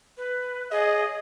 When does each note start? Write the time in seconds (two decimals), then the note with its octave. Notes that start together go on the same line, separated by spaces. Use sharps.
0.17 B4
0.71 G#4 D#5